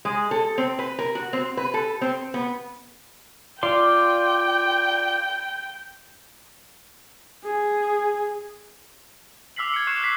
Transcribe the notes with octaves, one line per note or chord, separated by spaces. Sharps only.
G#3
A4
C4
B4
A#4
F#4
C4
B4
A4
C4
B3
F4 D5 G5 C6
G#4
D6 E6 F6 B6 C7 F#7
G#6 C#7
C#6 F#6 C7 E7
E6 F#6 B6 C7